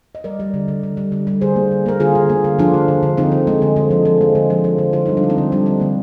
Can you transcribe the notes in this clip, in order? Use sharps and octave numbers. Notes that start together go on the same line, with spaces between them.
D#5
G3 A#4 D5
G3
D3
D3
D3
G3
D3
G3
D3 G#4 C5
A#3
D3
A#3 A#4
D3 F4 G#4
D3
A#3
D3
F3 D4 F4
D3
D3
D3
D3 C4 D#4
D3
G#3
D3
D3
F3
F3
G#3
D3
F3
F3
D3
D3 F4
G3 D#4
D4
D3
C4 D#4
D3
G3 D4
D3 C4
D3 A#3